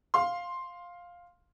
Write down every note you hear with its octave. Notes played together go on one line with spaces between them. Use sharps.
F5 C6